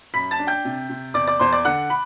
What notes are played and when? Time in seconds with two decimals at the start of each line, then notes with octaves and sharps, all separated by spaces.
0.14 F#2 B5 B6
0.31 A5 A6
0.39 D4
0.47 G5 G6
0.65 C3
0.89 C3
1.14 E2 D5 D6
1.27 D5 D6
1.40 E2 C5 C6
1.52 D5 D6
1.65 D3 F#5 F#6
1.90 B5